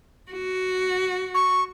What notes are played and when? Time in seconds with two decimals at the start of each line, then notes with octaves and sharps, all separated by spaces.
0.32 F#4
1.35 C#6